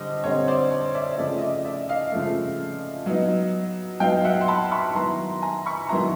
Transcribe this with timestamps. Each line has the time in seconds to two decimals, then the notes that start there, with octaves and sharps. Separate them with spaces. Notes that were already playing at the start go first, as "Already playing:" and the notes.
Already playing: D3 G3 C4 D#5
0.24 D3 G3 C4 C#5 D#5
0.47 C5 D5
0.71 C#5
0.94 D5 E5
1.13 D#5
1.18 C#3 F3 A3 D5 E5
1.38 D#5
1.41 D5 E5
1.65 D5 E5
1.89 D#5 F5
2.12 C#3 F3 A3
3.06 F#3 B3 D#4
4.00 F#3 B3 D#4 F5 G5
4.24 E5 F#5
4.41 C6
4.48 A5 B5
4.63 C6
4.72 B5 C#6
4.95 D#3 F#3 B3 E4 A#5 C6
5.42 G#5 A#5
5.66 B5 C#6
5.89 D#3 F#3 B3 E4 A#5 C6